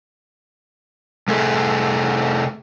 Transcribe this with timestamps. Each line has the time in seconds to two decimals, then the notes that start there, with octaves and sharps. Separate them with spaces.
1.28 C3 A3 G#4 A4